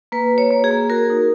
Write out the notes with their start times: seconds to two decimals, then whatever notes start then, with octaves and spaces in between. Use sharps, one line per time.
0.12 A#3 B4
0.32 F#4
0.38 C#5
0.51 A#3
0.64 G#4
0.71 A#3
0.90 F#4 A#4
1.10 D#4